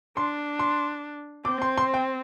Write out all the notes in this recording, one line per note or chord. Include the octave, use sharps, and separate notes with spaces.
D4 C6
C6
C4 D6
C6
C6
G5